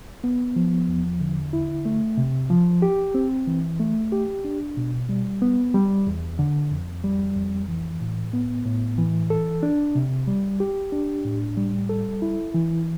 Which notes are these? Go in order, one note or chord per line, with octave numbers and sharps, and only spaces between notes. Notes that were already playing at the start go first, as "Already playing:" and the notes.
B3
F3
E2
D3
E4
A3
C3
F3
G4
C4
E3
A3
G4
D4
B2
G3
B3
G3
E2
D3
F2
G3
F2
E3
A2
B3
A2
E3
A4
D4
C3
G3
G4
D4
A2
G3
A4
E4
E3